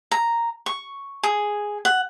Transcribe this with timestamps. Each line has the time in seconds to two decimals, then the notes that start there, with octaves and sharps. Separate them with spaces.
0.11 A#5
0.66 C#6
1.23 G#4
1.85 F#5